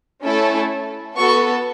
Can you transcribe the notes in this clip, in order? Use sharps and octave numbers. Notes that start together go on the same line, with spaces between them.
A3 C#4 E4 A4
B3 F#4 A4 C#6